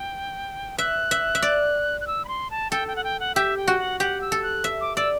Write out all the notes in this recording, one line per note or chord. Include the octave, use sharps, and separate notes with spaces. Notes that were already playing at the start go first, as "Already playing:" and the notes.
Already playing: G5
E5 F#6
E5
E5
D5
F#6
E6
B5
C6
A5
A4 G5
G5
F#5
G5
F#5
G4 E5
G5
F#4
F#5
G4 F#5
E6
A4
F#6
E5
D6
D5 E6